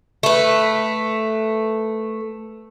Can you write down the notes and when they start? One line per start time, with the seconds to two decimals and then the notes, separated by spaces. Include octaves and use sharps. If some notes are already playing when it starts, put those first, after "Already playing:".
0.23 A3 B4